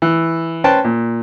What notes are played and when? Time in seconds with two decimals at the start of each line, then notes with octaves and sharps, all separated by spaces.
0.02 E3
0.64 C#4 B4 C5 G5 A5
0.84 A#2